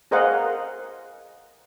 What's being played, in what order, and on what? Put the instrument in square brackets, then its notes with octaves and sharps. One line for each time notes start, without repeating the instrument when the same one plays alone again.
[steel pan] G#4 A#4 C5 D#5 F5 F#5